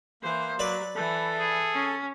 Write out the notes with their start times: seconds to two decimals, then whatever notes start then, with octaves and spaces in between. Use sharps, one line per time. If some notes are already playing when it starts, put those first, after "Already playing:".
0.23 E3 A#3 C5
0.59 F#3 B4 D5 B5
0.95 E3 A4
1.39 G#4
1.74 C#4